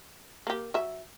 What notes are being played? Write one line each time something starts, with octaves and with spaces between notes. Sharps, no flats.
A#3 G4
F#3 E5